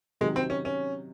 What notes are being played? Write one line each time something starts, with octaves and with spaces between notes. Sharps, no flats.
C3 D#3 F#3 G#3
C4
C#4
C#4